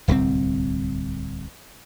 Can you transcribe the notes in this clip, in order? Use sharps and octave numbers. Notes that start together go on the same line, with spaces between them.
D1 C2 C#3 C4